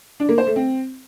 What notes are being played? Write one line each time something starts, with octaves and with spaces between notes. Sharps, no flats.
D4
A#3
C5
A3
C4